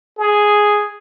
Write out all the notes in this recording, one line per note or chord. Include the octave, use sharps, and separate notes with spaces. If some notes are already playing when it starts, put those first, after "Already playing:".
G#4